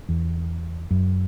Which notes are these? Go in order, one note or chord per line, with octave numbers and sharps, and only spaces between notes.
E2
F#2